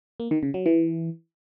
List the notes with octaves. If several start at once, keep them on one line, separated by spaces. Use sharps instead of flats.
A#3
D#3
C#3
F#3
E3